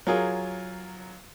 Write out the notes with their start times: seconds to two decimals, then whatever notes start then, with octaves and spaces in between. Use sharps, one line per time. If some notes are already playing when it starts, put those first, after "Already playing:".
0.07 F#3 F4 G#4 A#4